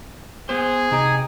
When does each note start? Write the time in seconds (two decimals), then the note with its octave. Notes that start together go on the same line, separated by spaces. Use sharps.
0.49 B3 G#4 C5
0.91 C3 D#4 G4 G#5